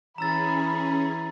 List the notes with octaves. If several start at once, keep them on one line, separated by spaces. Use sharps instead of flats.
E3 C#4 G#4 A#5 B5 E6 A6